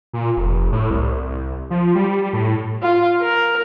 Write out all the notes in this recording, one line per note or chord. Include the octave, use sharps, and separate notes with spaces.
A#2
F1
A2
C2
F3
G3
A2
F4
A#4